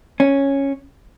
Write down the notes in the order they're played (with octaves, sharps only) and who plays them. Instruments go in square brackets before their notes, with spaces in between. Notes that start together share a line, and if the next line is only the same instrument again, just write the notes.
[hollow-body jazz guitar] C#4